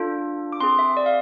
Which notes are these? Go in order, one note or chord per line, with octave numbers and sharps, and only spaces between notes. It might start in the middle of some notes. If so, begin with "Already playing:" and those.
Already playing: D4 F4 A4
D6
C4 G#4 C6
E5
D5
F5